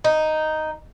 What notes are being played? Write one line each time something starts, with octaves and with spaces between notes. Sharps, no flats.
D#4